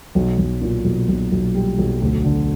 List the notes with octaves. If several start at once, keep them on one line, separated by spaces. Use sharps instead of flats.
B1
B1
A#2
B1
B1
B1
G3
B1
D2
D3